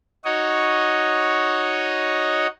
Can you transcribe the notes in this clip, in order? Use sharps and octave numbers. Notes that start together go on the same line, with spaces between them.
D#4 F#4 C#5 D#5